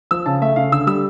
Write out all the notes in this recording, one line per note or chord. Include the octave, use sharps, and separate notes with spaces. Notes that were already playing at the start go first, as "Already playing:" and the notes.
F3 E6
C#3 A5
A3 E5
C#3 F5
D3 E6
G3 E6